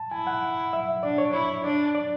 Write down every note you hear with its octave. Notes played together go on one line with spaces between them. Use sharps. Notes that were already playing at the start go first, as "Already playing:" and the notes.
Already playing: A5
E4 G#5
F#5
E5
D4 D5
C#5
E4 C#5
D4 D5
D5